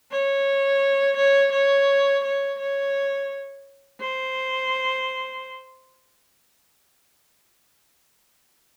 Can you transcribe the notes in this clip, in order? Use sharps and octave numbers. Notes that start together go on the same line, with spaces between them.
C#5
C#5
C#5
C#5
C#5
C5